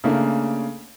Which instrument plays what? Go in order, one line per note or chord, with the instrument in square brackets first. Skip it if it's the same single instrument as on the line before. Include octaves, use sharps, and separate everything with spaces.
[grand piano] C#3 A3 A#3 D4